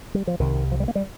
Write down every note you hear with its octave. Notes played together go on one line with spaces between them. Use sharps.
G3
F3
C2 C3 D#3
F3
G3
A#3
G3